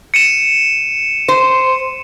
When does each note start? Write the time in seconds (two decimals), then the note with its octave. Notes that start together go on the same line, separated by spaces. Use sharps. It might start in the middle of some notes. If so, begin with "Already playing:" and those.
0.14 C#7 D#7 E7
1.28 C5